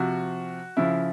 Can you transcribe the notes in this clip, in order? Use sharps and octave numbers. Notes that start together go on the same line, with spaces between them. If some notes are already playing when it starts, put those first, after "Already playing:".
Already playing: C3 F3 F#4
C#3 F3 E4